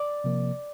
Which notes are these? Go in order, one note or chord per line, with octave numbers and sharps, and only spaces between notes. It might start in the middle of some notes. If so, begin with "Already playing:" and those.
Already playing: D5
C3 F3 A#3